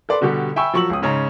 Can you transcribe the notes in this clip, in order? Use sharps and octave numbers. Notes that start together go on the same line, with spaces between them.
A4 B4 D5 C6
B2 D3 G3 F#4 G4 A4
E5 G5 G#5 B5 C#6 E6
F3 F#3 C#6 E6 F#7
C#2 C#4 D#6
G#2 C#3 C#4 D#4 A#5